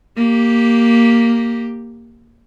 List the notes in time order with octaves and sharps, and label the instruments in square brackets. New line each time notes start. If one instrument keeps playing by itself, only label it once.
[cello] A#3 G4